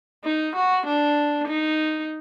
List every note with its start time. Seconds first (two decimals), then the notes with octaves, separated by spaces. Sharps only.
0.25 D#4
0.55 F#4
0.86 D4
1.48 D#4